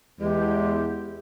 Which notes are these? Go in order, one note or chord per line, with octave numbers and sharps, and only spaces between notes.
E2 G#3 G4